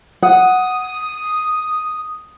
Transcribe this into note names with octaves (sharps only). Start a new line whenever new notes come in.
F#5 D#6